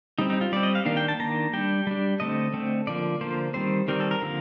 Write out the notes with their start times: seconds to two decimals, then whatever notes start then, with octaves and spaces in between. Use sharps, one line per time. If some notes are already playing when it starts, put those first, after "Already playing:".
0.18 G3 C4 D#4
0.30 D#4
0.41 F4
0.52 G3 C4 D5
0.63 D#5
0.75 F5
0.85 D#3 A#3 D4 F5
0.97 G5
1.08 A5
1.19 D#3 A#3 D4 A#5
1.53 G3 D4 G5
1.87 G3 D4
2.20 D3 A3 C4 D#5
2.54 D3 A3 C4
2.87 D3 F3 A#3 D5
3.21 D3 F3 A#3 C5
3.54 D#3 G3 C4 C5
3.88 D#3 G3 C4 A#4
4.00 A4
4.11 A#4
4.22 D3 F3 A#3